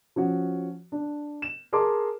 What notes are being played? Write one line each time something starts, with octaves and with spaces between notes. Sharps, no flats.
F3 C#4 F#4
D4
E7
G#4 A#4 A5 C6 D6